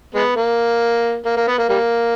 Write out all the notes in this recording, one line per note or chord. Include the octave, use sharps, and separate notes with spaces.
G#3 B3
A#3
A#3
A#3
B3
A#3
G3 A#3